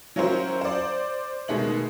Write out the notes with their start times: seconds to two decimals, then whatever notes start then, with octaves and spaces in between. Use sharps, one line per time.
0.16 F#3 C#4 E4 F#4 A#4 C5
0.61 C5 D5
1.48 B2 D#3 G#3 A3 F#7